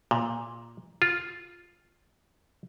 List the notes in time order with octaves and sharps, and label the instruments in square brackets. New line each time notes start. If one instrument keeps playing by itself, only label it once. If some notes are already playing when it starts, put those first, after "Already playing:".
[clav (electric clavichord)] A#2
F4